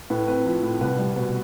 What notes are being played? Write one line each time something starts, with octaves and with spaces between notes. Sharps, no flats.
A2 B4
C4 B4
F3
A2
C2 B4
G3
B2